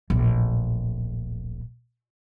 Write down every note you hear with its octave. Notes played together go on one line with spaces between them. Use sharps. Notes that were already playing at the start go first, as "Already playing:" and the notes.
D1 A#1